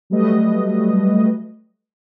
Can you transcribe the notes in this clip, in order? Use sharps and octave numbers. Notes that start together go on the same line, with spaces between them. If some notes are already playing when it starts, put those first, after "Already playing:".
F#3 G3 A3 B4 D#5